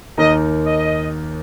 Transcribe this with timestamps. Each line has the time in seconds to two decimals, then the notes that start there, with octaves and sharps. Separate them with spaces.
0.17 D#2 D#3 A#3 D#4 A#4 D#5
0.65 D#5